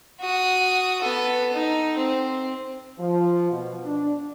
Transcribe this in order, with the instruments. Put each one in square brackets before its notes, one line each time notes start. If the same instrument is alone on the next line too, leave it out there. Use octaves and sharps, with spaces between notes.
[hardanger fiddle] F#4 D#6
B3 A4
D#4
C4
[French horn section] F3
B2
D4